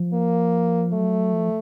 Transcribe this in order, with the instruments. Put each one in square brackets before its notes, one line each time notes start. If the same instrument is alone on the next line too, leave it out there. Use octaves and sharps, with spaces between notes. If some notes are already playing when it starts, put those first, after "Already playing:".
Already playing: [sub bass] F3
[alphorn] A#3
[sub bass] F#3 [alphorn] A3
[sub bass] F3